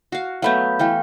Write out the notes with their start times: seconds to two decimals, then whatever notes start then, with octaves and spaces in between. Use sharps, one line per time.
0.12 F#4 F5
0.42 F#3 A3 B3 F5 B5 G6
0.79 E3 A3 F5 G5